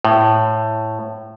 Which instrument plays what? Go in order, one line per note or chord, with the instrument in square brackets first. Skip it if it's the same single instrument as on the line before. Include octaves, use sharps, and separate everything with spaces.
[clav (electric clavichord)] A2